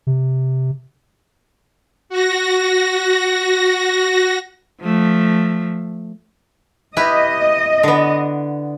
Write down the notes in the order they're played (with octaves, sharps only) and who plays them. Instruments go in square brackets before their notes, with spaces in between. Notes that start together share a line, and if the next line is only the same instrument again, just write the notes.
[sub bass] C3
[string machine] F#4 A#6
[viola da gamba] F3 A3
[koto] E4 G4 B4 [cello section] D#5
[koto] D3 B3